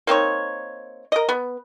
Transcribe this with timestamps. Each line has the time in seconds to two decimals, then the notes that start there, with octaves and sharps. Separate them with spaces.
0.07 A#3 C4 D#4 C#5
1.12 A#4 D#5
1.29 B3